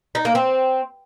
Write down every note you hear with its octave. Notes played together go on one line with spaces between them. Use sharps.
D#4
A#3
C4